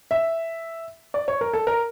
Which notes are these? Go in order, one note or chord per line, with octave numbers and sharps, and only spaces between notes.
E5
D5
C#5
A#4
A4
A#4